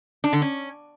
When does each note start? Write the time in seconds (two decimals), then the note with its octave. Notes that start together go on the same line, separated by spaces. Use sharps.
0.24 D4
0.33 D3
0.42 C#4